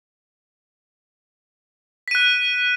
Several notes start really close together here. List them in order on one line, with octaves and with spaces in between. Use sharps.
B6 D#7 F#6